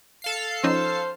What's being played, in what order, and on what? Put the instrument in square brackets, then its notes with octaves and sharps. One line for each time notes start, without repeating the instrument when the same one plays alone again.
[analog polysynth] A4 F5 C7
[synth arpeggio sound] F3 C#4 D#4 [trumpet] C5